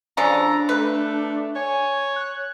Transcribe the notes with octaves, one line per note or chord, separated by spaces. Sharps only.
C#3 F3 D4 A4 A#5
A3 B4
C#5 G#5
F#6